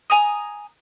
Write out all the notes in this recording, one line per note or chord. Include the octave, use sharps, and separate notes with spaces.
G#5 A#5 D#6